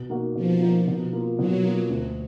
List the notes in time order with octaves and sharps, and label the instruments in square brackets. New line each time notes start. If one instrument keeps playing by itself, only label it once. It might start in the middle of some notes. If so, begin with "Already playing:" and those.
Already playing: [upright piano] B2
A#3 D#4 F#4
[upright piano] B2 [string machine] F3
[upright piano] A#3 D#4 F#4
B2
A#3 F4
[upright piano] B2 [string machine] F#3
[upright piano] A#3 F4
D2